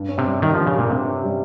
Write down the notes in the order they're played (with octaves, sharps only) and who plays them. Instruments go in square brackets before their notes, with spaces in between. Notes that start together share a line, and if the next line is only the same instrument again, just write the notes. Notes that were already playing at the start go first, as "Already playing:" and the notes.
Already playing: [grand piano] G2
C#4
[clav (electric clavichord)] C3
[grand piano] G3
[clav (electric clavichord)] D#3 [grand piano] G3
[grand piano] G2 [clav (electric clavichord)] F3
[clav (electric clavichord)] C#3
[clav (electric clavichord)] A#2 [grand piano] G3
[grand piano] G2 [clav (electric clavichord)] C3
[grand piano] C#4
G3